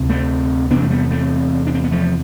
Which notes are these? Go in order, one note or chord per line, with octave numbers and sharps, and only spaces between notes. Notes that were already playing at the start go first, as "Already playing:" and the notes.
Already playing: D2 C3
A3 C4
E2 C3 B3 D4
A3
G3 B3
A3 C4
D4
C4
B3
F3 A3